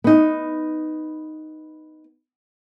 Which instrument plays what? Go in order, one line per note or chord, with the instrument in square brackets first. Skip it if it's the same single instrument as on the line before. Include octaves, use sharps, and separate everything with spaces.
[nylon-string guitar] B3 D#4